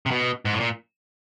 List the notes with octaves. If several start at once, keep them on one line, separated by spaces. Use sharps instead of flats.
C3
B2
G#2
A2
A#2